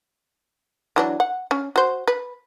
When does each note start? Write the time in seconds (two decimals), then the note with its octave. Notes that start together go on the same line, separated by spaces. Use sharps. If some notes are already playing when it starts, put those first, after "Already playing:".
0.96 E3 F#3 D4
1.20 F#5
1.51 C#4
1.76 F#4 C5
2.07 B4